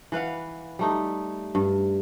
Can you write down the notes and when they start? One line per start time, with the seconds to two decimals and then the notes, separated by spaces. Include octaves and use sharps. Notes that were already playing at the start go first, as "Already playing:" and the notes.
0.12 E3 B4 F5 F#5
0.79 G3 A3 D#4
1.55 G2